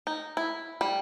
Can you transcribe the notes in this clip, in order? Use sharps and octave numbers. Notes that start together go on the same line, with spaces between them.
D#4
E4
G3